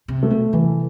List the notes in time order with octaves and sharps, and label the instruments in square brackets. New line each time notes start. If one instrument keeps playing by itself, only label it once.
[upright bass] C3
[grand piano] A3
[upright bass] B2
[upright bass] C3 [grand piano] E3